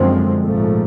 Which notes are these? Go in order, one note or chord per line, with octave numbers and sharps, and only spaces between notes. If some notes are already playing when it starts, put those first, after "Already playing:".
Already playing: F#2 D3 F3 G#3 C4
A#1 G#2 F3 A3